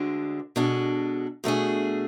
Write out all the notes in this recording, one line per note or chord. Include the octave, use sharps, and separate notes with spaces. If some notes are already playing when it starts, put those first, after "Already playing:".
Already playing: D2 D3 G#3 D4
B2 G#3 D4 A4
B2 A3 D4 G#4